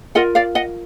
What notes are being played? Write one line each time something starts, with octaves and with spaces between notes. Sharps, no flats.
F4 A#4 D#5 F#5
D5 F5
D#5 F#5